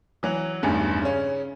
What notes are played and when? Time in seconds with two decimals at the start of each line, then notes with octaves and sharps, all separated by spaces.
0.23 E3 F#3
0.63 A1 E2 G2 D#3
1.02 C#3 C#4